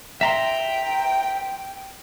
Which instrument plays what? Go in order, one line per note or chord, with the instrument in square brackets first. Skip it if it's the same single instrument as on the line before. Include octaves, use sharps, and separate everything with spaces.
[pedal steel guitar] E5 A#5 C6 [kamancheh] G5